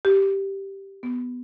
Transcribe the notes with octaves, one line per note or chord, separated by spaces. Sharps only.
G4
B3